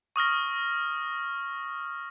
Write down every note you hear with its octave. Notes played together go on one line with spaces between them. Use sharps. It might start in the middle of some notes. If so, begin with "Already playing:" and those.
C#6 D#6 F6 A#6